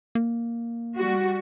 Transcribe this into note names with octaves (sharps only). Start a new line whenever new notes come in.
A#3
G3 F#4